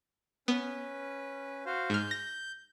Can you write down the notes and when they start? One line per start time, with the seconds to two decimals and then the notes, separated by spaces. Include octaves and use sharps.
0.48 B3 C#4 B4
1.66 F#4 C5 F5
1.90 G#2 F6 G6
2.11 A#6